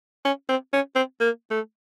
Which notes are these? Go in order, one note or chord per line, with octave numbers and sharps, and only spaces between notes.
C#4
C4
C#4
C4
A#3
A3